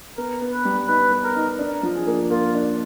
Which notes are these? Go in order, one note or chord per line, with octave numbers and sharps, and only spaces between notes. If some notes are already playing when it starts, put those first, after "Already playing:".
B3 A#4
B3
B4
G3
D#4 B4
B3
A#4
D#4
D4 A#4
F3
G#4
A#3
A#3 F4
D4